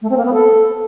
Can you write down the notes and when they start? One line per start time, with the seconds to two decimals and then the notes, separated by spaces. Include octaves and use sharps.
0.01 A3
0.09 C4
0.17 A#3
0.25 B3
0.33 A4